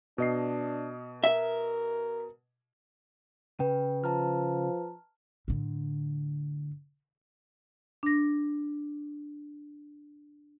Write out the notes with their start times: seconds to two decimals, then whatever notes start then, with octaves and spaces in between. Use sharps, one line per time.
0.18 B2 D4 D#5 C7
1.24 A#4 E5
3.60 C#3 B4 G5
4.04 F3 A5 A#5 F6
5.48 A2 D3
8.03 D4 A#6